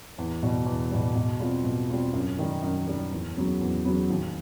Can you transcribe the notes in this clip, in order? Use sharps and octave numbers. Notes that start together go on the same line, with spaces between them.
E2
B2 G3
E2
B2 G3
B2
G3 C4 F4
B2
G3 C4 F4
F#2
D#3 G3
F#2
D#3 G3
E2
C#3 F#3 B3
E2
C#3 F#3 B3
D#2